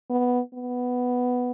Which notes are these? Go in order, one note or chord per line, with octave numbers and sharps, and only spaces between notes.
B3
B3